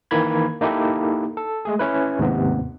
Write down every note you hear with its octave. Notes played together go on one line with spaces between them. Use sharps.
D#3 E3 A#3 A#5 B5 G#6
A#3 D#4 E4 G4 A4
A4
G#3 A3 G#4
C#4 E4 B4
D#2 G#2 C3 B3